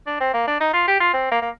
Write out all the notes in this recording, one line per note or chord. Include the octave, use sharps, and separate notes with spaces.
D4
C4
A#3
D4
D#4
F4
G4
F4
C4
A#3
A#3